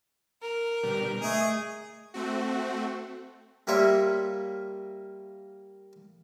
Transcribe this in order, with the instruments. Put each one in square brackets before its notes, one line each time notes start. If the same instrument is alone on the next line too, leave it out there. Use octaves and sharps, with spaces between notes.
[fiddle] A#4
[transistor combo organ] B2 D3 G3
[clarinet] A3 [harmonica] G#4 [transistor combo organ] D#5
[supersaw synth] A3 C4 F#4
[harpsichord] G3 A#3 F4 C#5 E5